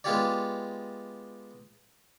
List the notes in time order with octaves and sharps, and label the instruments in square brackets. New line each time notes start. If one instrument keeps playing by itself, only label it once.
[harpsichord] G#3 B3 F4 G4 C#5 D5